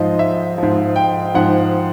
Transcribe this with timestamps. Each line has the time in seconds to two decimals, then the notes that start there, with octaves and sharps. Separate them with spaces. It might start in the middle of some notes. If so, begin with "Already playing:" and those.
Already playing: G#2 F3 D#5
0.19 E5
0.58 G#2 F3
0.96 G5
1.34 G#2 F3 F#5